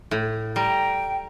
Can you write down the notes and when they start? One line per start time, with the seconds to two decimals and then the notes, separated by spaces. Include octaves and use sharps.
0.11 A2
0.56 G3 G5 A#5